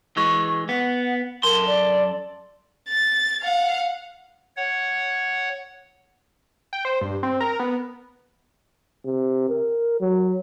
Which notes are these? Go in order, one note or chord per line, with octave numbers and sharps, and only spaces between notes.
E3 G#3 C#6
B3 F#5
F#2 A4 A#4 C6
D5
A6
F5 F#5
C#5 F#5
G5
C5
G2
C4
A#4
B3
C3
A#4
F#3